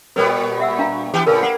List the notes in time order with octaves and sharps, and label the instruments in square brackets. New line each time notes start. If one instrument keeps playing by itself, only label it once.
[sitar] A#2 G3 B3 [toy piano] A#4 B4 C#5
[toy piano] E5 F#5 E6
D4 F5 A#5
[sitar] E3 B3 G4
[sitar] A2 C#3 [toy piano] A#4 B4 F5
[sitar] A#3 [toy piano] F#5